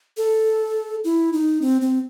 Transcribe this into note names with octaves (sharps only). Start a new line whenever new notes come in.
A4
E4
D#4
C4
C4